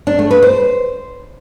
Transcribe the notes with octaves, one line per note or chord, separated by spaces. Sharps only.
D4
A3
B4
C5